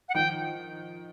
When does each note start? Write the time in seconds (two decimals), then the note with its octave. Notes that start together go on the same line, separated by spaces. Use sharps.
0.09 F#5
0.15 D#3 F3 G5